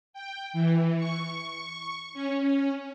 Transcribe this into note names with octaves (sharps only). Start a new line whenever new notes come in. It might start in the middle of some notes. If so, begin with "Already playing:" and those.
G5
E3
C#6
C#4